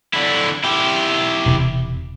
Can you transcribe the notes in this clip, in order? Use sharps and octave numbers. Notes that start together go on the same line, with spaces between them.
D3 E4
E4 G4
E1 C3